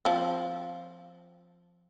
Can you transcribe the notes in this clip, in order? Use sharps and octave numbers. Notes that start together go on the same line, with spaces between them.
F3 C4